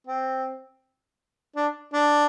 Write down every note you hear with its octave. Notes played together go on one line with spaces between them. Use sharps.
C4
D4
D4